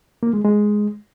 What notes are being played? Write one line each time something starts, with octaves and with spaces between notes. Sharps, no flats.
A#3
G#3
G#3